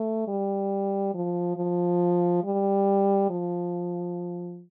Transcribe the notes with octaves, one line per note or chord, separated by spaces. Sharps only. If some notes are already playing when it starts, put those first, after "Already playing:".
Already playing: A3
G3
F3
F3
G3
F3